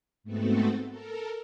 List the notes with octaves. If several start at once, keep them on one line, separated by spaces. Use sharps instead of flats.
G#2 A3 B3 C4 F#4 A4
A4 A#4